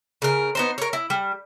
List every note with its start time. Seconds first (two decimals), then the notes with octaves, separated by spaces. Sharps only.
0.22 C#3 A#4
0.55 B3 D#4 C5
0.78 A#4 C#5
0.93 E4
1.10 G3